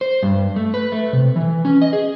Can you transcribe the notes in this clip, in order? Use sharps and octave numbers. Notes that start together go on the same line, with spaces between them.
C5
G2
A3
B4
A3
C3
E3
C#4
D#5
G#4